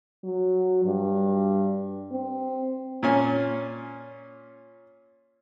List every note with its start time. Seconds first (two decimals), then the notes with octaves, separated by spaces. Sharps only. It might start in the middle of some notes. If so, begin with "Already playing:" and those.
0.24 F#3
0.85 G2
2.11 C4
3.03 A#2 C#4 G#5